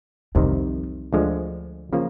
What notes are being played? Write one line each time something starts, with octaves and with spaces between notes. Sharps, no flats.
C2 F2 C3 D#3
D2 D3 F3 G#3
C#3 F3 A#3